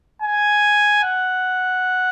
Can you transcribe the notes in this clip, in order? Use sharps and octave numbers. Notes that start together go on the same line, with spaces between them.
G#5
F#5